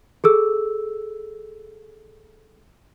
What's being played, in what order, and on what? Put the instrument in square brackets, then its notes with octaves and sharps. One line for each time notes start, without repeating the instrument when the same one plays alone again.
[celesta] G#4 A4 E6